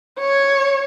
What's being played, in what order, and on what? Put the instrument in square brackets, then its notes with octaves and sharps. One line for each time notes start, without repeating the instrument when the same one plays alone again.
[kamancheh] C#5